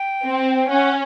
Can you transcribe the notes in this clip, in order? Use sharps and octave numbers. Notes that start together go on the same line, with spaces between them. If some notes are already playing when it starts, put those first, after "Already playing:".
Already playing: G5
C4
C#4 F#5